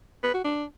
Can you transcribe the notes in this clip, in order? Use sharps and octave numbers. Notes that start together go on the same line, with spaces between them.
B4
F#4
D4